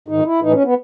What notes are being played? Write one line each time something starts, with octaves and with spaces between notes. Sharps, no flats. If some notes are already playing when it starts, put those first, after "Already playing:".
G#2 D#3 D#4
E4
A2 E3 D#4
C#4
B3